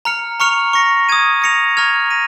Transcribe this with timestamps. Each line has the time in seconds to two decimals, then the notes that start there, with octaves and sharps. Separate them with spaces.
0.05 A#5 F6 C#7
0.40 A#5 C#6 F6 C#7 F7
0.73 C#6 A#6 C#7
1.09 D#6 G#6 D#7
1.42 D#6 A#6 C#7 F7
1.77 A#5 C#6 F6 G#6 F7
2.10 A#6 D#7